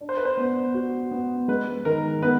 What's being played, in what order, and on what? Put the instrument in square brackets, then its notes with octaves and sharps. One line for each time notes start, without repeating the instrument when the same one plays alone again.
[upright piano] D4
[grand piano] C5
B4
C5
[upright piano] B3
F#4
B3
[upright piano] G#3 [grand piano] B4
[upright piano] D#3 [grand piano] A#4
[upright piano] B3 [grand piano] B4